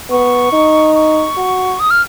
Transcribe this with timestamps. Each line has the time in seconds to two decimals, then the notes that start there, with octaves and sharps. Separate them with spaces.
0.10 B3 C#6
0.52 D#4
0.95 C#6
1.37 F#4
1.80 D#6
1.91 F6